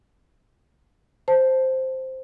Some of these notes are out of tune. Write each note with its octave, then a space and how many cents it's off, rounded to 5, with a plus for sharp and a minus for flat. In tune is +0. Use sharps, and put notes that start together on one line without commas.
C5 +0 A5 +0